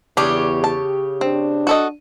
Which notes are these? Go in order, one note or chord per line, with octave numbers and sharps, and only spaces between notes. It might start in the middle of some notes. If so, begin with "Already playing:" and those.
E2 C#3 D4 G4 C#5
A5
C4 D4
F#4 A4 D#5